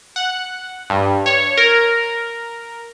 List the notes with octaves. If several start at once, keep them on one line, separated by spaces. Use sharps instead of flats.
F#5
G2
C#5
A#4